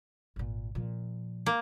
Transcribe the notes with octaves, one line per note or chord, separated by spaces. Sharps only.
G#1 A#2
A#2 F3
A#3